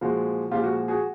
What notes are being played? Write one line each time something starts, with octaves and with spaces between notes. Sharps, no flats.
A#2 F3 G#3 F#4
A#2 F3 G#3 F4 G4
F#4
F#4 G#4